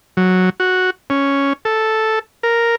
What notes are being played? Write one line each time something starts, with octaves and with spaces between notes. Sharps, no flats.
F#3
F#4
C#4
A4
A#4